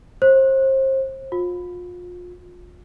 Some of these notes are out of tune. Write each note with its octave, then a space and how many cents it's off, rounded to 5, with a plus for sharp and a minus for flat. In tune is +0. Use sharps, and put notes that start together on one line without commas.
C5 +30
F4 +30